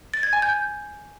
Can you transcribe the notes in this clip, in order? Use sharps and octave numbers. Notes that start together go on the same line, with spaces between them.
A6
G#6
G#5
G6